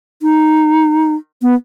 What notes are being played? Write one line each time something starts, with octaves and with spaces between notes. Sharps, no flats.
D#4
B3